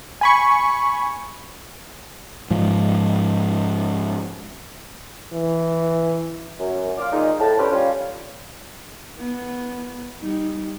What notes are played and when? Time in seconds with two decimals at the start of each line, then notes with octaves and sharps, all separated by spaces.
0.21 G#5 B5 C#6
2.50 G#2 F3
5.33 E3
6.60 F#2
6.98 A#2 F4 F5 D6
7.13 A#2 D#3 G#3 D#4
7.40 A2 A5
7.58 C#4 D4 G4 B4 C5
7.71 G3 C#4 F4
9.19 B3
10.21 G3 D#4